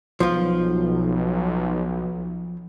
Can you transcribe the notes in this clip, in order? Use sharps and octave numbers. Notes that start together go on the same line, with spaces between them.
B1 F3 F4